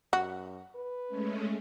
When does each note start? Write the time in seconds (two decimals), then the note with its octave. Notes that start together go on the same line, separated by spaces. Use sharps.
0.13 F#2 F#4
0.75 B4
1.07 G#3 A3 C#4